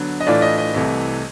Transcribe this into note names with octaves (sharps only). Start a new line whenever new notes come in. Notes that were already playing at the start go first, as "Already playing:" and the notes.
Already playing: D3 F#3 B3
D#5
A2 E3 A3 D4 F4 D5
D#5
D#5
C2 C3 E3 A3